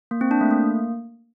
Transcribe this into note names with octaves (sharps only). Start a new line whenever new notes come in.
A#3
C4
D4
A3
A#3